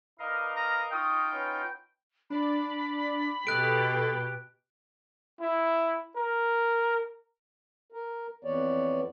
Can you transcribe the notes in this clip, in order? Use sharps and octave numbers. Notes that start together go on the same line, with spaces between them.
D#4 A#4 B4 D5 D#5 F5
A#5
D#4 F4 G5 C#6 D#6
C#4 B4 F#5
D4 D5 B5
B2 G4 A4 D#5 F#6 A6 D7
E4
A#4
A#4
F2 E3 B3 C#5 D5